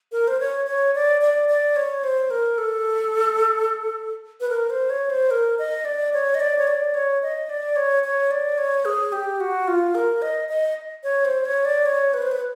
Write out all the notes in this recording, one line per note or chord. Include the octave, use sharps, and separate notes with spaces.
A#4
C5
C#5
C#5
D5
D5
D5
C#5
C5
A#4
A4
B4
A#4
C5
C#5
C5
A#4
D#5
D5
C#5
D#5
D5
C#5
D5
C#5
D#5
D5
C#5
C#5
D5
C#5
G#4
G4
F#4
F4
A#4
D#5
D#5
C#5
C5
C#5
D5
C#5
B4
C5
B4